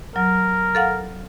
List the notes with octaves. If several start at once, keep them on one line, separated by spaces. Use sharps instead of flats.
F#3 A#4
A4 F5 F#5